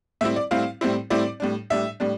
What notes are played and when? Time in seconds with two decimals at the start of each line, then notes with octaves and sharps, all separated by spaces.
0.21 A2 G3 C4 E4 E5
0.36 D5
0.51 A2 G3 C4 E4 F5
0.81 A2 G3 C4 E4
1.10 A2 G3 C4 E4 D5
1.40 A2 G3 D4
1.70 A2 G3 D4 E5
2.00 A2 G3 D4